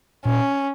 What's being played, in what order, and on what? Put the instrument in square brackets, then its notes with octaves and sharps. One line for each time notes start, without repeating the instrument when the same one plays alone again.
[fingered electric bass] A#2 [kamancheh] C#4